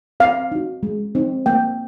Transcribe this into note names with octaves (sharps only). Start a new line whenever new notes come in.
C4 F5
D#4 F#4
G#3
C4 D#4
A#3 G5